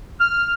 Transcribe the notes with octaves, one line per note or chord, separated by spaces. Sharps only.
F6